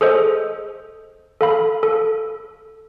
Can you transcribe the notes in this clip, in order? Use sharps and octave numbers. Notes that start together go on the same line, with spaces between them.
G#4 A4 C5 D#5
A4 F5 B5
A4